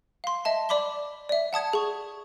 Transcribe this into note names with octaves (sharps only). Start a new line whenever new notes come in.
F5 C6
D#5 E5 A5
D5 B5 D6 B6 G7
D5 E5
F#5 A5 D#6 G#6
G#4 C#6